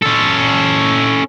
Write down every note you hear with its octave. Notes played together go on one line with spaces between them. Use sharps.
C#4 A4